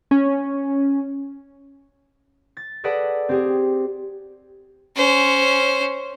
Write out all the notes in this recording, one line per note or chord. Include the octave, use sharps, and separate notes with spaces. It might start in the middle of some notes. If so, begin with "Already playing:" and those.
C#4
A6
G#4 A4 B4 D5 D#5 F#5
C4 G4 G#4
C#4 C5